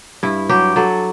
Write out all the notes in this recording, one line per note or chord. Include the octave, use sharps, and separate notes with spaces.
G2 E4
F#3 G4
F#3 A4